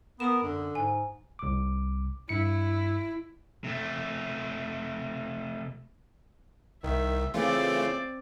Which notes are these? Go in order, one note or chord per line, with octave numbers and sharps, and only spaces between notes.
B3 A#4 D#6 E7
F#2 D3
G#2 G#5
C2 D6
G2 E4 C#7
C3 A3
C2 D#3 E5
C#3 E3 A3 C4 F4 D5